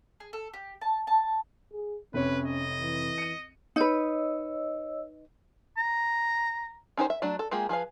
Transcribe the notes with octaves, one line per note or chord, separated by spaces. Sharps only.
G#4
A4
G4
A5
A5
G#4
F1 C3 C#4 B4 C#5
D#5
E3
C#7 D#7
D#4 B4 C#5 D#5 E6
A#5
C#4 D#4 G4 C5
E5
F#3 A3 D4
A4
G#3 A#3 F4 G4 G#4
F3 G#4 B4 F5